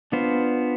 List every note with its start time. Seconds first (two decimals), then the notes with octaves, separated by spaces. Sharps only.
0.12 B3 D4 F4 C5